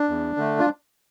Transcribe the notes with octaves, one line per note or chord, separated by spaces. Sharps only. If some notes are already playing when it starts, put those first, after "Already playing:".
Already playing: D4
E2
D3 A3
F4